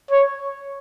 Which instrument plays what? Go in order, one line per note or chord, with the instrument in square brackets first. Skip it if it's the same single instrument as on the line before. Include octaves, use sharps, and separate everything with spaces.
[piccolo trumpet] C#5